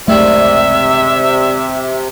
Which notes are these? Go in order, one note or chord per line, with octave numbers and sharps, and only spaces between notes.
F#1 C#2 G#2 C3 D#3 G3 A3 E5